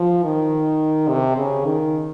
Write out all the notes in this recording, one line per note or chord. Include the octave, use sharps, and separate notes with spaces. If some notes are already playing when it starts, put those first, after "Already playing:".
Already playing: F3
D#3
C3
C#3
D#3